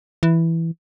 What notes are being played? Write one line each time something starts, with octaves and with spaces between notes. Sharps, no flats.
E3